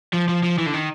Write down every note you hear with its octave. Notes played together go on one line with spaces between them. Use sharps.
F3
F3
F3
E3
D3
D#3